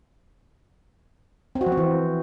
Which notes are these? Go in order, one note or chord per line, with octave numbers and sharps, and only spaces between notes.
C4
F#4
F3
C4
E3